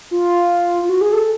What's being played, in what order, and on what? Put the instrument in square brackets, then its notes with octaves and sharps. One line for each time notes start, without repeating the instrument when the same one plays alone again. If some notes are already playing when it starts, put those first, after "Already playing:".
[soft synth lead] F4
F4
F#4
G#4
A4